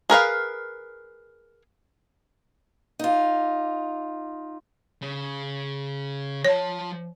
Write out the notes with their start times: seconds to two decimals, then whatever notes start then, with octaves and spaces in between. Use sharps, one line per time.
0.10 G#4 A#4 B4 F5
2.99 D#4 F4
5.02 C#3
6.45 F3 C#5 A5